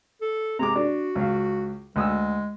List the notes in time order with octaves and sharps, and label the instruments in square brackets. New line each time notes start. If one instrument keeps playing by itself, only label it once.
[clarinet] A4
[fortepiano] C3 G#3 D6 [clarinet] A#5
[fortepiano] D4 [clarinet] F#4
[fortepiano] C#2 F5
[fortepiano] D2 D#6 E6 [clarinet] G#3